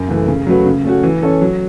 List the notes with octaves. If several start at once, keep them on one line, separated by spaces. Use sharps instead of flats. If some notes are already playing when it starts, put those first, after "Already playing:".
Already playing: F#2
C#3 E3 A3
C#3
F#3 A3 F#4 B4
C#3
A3 C#4 F#4
E3
C#4 A4 C#5
F#3